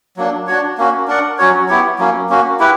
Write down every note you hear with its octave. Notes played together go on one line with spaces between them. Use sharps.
F#3 A#3 D4
D4 F#4 C#5
A#3 C#4 F#4
D4 A#4 D5 F#5
F#3 C#4 F#4 C#5
B3 E4 G4 C#5
F#3 A#3 C#4
A#3 C#4 F#4
E4 G4 B4